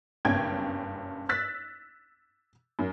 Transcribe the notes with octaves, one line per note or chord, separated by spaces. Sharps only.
F#1 B1 G2 C#4 G5 G#6
E6 F#6 A6 B6
F#2